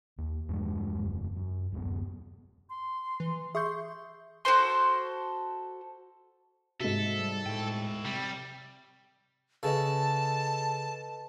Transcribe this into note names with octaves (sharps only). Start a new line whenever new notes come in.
D#2
E2 G2 F3 G#3
E1 F#2
F#2
D1 F#2 B3
C6
E3
G#4 E5 C6 C#6 G6
F#4 A4 C5 C6
G#2 C3 F#4 A4 E5
G3
A2 E4 G5
C3 G3
C#3 A4 B4 D#5 A5